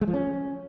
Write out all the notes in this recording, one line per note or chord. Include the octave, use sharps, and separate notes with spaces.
G#3
F3
C#4